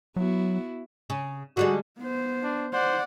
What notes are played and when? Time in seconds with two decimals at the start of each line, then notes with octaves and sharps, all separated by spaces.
0.16 F#3 B3 E4 F#4
1.10 C#3
1.57 D3 G3 G#3 F#4
1.99 B3 C5
2.44 D4
2.73 C5 D5 F#5